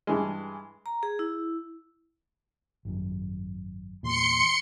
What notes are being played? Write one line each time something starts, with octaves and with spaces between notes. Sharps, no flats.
G2 E3 G#3
A#5
G#4
E4
G#1 F#2
E2 A#2 C6 C#7